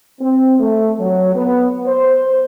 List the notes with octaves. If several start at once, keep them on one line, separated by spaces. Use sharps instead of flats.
C4
A3
F#3
B3
C5